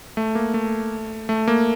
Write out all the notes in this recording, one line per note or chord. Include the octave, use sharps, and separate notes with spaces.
A3
A#3
A3
A3
A#3